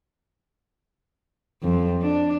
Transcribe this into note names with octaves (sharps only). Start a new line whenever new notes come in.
F2
D4